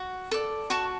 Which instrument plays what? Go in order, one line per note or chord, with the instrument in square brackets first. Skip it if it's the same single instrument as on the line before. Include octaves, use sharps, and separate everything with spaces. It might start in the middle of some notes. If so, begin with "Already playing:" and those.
Already playing: [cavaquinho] F#4
A4 D5
F#4 A5 C#6